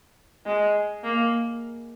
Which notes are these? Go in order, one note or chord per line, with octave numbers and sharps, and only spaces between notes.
G#3
A#3